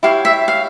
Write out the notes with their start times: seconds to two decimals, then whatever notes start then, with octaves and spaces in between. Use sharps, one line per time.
0.03 E4 G4 C#5 F5
0.25 E5
0.48 F5